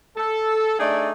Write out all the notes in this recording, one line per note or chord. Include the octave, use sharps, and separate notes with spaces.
A4
A3 D4 D#4 G#4 D5